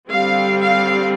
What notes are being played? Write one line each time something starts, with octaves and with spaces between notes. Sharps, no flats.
D3 G3 C4 F5
F5